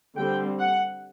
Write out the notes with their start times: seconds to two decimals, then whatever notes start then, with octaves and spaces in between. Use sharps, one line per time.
0.17 D3 G3 C4 G5
0.59 F#5